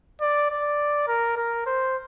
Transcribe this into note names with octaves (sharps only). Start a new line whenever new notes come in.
D5
D5
A#4
A#4
C5